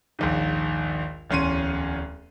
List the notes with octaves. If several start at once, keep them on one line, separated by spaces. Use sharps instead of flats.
A#1 D#2 G#2
D1 E2 C#4 C6 D#7